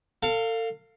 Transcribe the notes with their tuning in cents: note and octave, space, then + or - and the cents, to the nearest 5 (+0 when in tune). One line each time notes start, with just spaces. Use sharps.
A4 +40 F5 +0